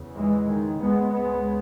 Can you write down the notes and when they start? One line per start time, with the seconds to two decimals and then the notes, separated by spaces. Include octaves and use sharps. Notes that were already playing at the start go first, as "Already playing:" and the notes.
Already playing: E2 C#3
0.16 E3 G#3
0.48 D#3
0.80 C#2 C#3 G#3 B3
1.12 G#3 B3